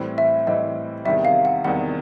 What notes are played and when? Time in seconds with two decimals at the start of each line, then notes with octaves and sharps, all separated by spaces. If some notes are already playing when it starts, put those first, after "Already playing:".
Already playing: A2 E3 G3 C4
0.18 E5
0.47 A2 E3 G3 C4 D#5
1.05 E2 C3 D#3 G3 E5
1.25 F5
1.45 F#5
1.64 E2 C3 D#3 G3 F#5